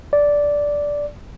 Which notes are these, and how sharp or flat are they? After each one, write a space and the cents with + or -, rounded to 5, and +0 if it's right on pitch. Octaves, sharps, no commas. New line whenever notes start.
D5 -10